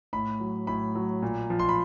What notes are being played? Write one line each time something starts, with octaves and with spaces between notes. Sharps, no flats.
A2 B5
F#3
A2 B5
F#3
A#2
F3
C6
B5